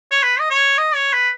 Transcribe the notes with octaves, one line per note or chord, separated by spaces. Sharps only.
C#5
B4
D#5
C#5
D#5
C#5
B4